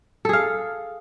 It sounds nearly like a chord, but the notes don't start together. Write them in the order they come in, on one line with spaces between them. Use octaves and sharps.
A4 G#4 F5